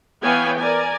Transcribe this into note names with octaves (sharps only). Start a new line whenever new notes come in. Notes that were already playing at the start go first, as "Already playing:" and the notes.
E3 B3 C#5 F5 G5 G#5
A#4 D5 G#5